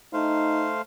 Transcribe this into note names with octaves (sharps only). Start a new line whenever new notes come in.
A3 D#4 C5 F5